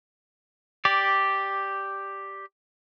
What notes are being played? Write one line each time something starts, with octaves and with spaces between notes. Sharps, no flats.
G4 D5